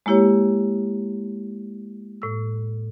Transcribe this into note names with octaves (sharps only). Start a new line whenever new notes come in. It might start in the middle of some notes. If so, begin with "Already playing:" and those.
G#3 A#3 E4 G4 C#5
A2 E6